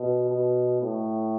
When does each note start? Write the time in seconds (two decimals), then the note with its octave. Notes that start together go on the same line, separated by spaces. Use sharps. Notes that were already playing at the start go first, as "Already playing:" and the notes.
Already playing: B2
0.29 B2
0.82 A2